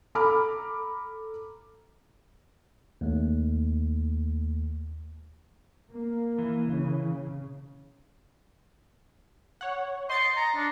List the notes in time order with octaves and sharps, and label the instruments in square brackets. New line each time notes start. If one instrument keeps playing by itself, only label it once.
[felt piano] A4 A#5 B5 D6 F6
[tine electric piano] D#2 A3
[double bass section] A#3
[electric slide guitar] E3
[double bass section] C#3
[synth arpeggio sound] C#5 F#5
[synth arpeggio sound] D#5 A6 C#7 [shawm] C6
[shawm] A#5
D4